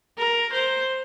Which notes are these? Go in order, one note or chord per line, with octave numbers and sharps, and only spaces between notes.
A#4
C5